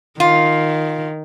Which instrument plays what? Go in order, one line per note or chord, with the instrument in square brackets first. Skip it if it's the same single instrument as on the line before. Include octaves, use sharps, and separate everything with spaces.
[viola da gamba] D#3 [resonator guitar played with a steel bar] F4